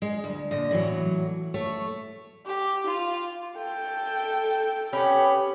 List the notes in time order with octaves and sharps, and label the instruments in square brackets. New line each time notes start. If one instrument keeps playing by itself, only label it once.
[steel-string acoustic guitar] G#3
D2
A#2 D3 D#5
A2 E3 F#3
A3 C#5
[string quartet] G4
F4
[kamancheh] A4 G5
[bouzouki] B3 C#4 [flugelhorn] G4 [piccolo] B5